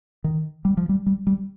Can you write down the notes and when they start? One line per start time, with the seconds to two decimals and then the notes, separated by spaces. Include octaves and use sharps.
0.24 D#3
0.65 G3
0.77 F3
0.89 G3
1.06 G3
1.27 G3